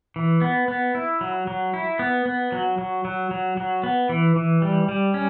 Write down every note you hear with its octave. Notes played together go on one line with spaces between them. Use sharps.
E3
B3
B3
E4
F#3
F#3
E4
B3
B3
F#3
F#3
F#3
F#3
F#3
B3
E3
E3
G3
G3
C#4